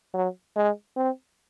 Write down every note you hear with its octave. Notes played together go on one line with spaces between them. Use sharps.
F#3
G#3
C4